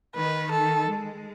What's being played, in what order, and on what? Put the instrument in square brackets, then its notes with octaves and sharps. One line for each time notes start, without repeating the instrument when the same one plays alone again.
[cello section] D#3 [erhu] B4
[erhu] A4
[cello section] G#3